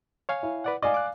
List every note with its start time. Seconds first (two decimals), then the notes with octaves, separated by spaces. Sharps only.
0.29 C#5 F5 G#5
0.43 E4
0.64 B4 D5 F#5
0.82 D5 D#5 F5 G#5
0.94 D6 F#6